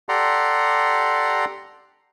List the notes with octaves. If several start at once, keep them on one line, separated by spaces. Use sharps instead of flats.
G4 A4 D5 F#5 A#5 C6